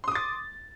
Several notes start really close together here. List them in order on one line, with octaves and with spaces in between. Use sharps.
C6 D#6 D6 A6